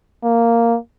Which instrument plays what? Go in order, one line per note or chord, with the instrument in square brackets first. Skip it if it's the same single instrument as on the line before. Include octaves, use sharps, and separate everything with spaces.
[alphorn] A#3